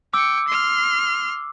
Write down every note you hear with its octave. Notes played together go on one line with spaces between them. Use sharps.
G5 D6 E6 C#7
C6 F6